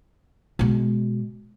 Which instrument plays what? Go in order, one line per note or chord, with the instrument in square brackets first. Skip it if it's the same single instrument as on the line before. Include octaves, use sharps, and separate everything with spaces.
[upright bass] B2 G#3